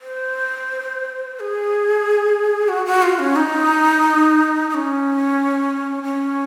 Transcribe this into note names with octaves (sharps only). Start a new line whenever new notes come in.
C5
C5
G#4
F#4
F#4
F4
C#4
D#4
D#4
C#4
C#4